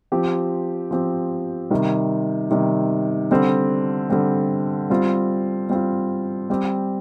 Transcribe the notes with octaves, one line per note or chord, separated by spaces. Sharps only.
F3 C4 G4
F3 C4 G4
C3 D#3 G3
C3 D#3 G3
D3 G3 C4
D3 G3 C4
G3 C4 F4
G3 C4 F4
G3 C4 G4